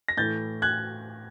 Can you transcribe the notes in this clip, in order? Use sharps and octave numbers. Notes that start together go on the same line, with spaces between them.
A#6
A2 E3 A3 G6 A6
F#6 G#6